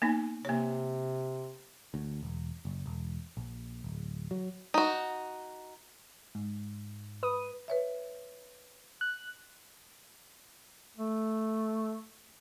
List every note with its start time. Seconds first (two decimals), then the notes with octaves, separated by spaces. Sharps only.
0.02 A#3 B3 D#4
0.45 C3 A#3 C#5
1.94 D2
2.23 E1
2.65 F#1
2.86 E1
3.37 A#1
3.84 D1
4.31 F#3
4.74 D#4 F#4
6.35 G#2
7.23 B4 D#6
7.68 B4 C#5 E5
9.01 F#6
10.97 A3